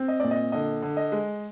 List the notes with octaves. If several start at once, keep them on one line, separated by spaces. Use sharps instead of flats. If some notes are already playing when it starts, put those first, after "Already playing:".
Already playing: C4
D#5
A#2 D5
D#5
D3 D#5
D3
D#5
G#3